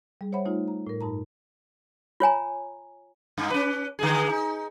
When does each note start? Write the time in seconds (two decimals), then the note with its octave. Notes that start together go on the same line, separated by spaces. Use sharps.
0.21 G3 G#4
0.32 C5 C#5 E5 F#5 B5
0.45 A3 D#4 F4
0.68 A#5
0.87 A2 A#4
1.01 G2 D#4 A5 A#5
2.20 F4 C#5 G#5 A#5
3.38 G2 D#4
3.50 C#4 B4
3.99 D3 G#3 G#4
4.29 D#4